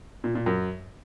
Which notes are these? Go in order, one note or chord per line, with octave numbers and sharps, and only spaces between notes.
A#2
A#2
F#2